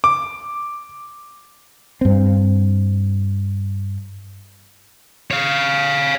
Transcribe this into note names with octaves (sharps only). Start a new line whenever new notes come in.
D6
G2 C4
C#5 F5